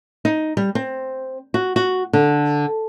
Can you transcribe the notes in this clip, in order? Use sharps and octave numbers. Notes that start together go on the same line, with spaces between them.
D#4
G3
C4
F#4
F#4
D3